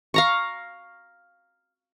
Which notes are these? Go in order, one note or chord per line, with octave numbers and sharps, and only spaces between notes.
F5 A#5 C#6